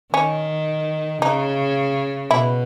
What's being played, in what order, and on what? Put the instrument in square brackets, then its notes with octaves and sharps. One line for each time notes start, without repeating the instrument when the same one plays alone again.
[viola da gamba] D#3 [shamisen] C#4
[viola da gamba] C#3 [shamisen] D#4
[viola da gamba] B2 [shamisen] E4